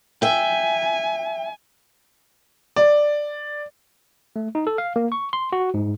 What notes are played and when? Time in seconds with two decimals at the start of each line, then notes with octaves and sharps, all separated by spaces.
0.22 E5 G5 G#5
2.76 D5
4.36 A3
4.55 D#4
4.67 A4
4.78 F5
4.96 A#3
5.12 C#6
5.33 C6
5.52 F#4
5.74 G#2